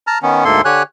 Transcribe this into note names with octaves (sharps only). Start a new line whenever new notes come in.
A5 A#5 F6
D#3 B3 C#4
D2 G#2 A#3 A4 C6
D3 G4 C#5 G#5 F#6